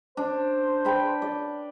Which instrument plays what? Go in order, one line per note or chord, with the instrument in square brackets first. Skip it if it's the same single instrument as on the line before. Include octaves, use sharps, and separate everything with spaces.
[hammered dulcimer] D4 [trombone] C5
[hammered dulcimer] B4 G5 B5
D5